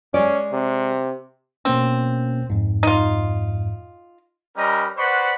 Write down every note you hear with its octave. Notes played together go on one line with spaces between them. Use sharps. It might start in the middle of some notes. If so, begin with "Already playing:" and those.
G#3 C#4 D5
C3
B2 A#3 C4 C#4
F2 G#2
D#4 F4
G3 C#4 A#4 B4 D#5 A#5
B4 C5 D5 F#5 B5 C#6